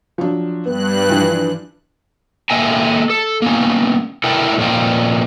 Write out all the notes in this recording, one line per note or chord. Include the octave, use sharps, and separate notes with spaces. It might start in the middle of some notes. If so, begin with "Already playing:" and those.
F3 F#3 D4
G2 B3 F#6
E3 F3 D4
A#3 A4 D#5 E5 G5 G#5
A4
A#3 B3 C#4
E4 A4 A#4 D5 F#5 G5
F2 A#2 C#4 F4 G5